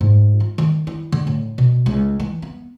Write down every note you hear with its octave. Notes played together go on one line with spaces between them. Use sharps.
G#2
F4
D#3
E4
D3
A2
B2
C#2
E3
B3